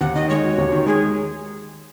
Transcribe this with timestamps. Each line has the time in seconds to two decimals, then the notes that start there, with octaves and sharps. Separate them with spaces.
0.01 D#2 F#5
0.15 D#3 D#5
0.30 G#3 C#5
0.43 F#4
0.58 D#2
0.72 D#3
0.87 G#3 G#4